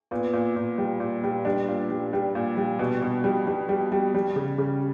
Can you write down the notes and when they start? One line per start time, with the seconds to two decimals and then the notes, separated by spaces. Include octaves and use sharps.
0.11 A#2 B3
0.33 A#2
0.56 A#2
0.78 G3
1.00 A#2
1.24 G3
1.45 G3 D4
1.68 A#2
1.91 G3
2.13 G3
2.35 A#2
2.57 G3
2.79 B2
3.02 B2
3.24 G3
3.47 G3
3.69 G3
3.92 G3
4.15 G3
4.36 C#3
4.58 C#3